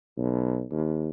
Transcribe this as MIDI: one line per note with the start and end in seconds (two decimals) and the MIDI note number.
0.18 0.65 35
0.71 1.09 39